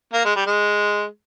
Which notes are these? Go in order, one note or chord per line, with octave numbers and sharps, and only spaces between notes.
A#3
G#3
G3
G#3